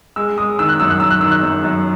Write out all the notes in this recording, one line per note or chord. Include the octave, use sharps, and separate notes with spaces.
G#3 E6
G#3 D#6
D#3 E6
F#6
F#2 E6
F#6
F#2 E6
F#6
D#3 E6
F#6
F#2 E6
F#2